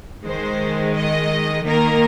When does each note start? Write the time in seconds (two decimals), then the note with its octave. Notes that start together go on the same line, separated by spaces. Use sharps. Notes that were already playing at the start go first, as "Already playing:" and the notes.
0.24 D#3 G#3 C5
0.94 D#5
1.64 D#3 A#3 A#4